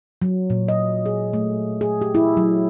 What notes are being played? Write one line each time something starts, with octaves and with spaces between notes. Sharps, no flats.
F#3
A#2
D#5
G#4
A3
G#4
G4
E4
F#3